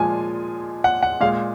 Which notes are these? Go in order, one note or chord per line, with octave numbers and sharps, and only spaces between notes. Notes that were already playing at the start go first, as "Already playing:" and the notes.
Already playing: A#2 F3 G#3 G#5
F#5
F#5
A#2 G#3 F5